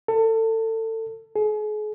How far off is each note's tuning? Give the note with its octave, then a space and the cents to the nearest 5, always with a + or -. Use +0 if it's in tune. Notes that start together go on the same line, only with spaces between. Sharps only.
A4 +25
G#4 +40